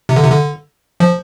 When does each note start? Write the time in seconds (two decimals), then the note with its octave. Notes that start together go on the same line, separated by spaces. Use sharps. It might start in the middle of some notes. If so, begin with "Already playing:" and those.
0.09 C3
0.16 D3
0.24 C3
0.31 D3
1.00 F3